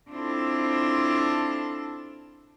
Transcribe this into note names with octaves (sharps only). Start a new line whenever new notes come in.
C4 D4 E4 F4 A4